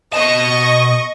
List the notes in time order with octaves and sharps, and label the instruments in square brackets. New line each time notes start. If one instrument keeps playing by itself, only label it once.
[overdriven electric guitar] B2 A5 [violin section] D#5 C#6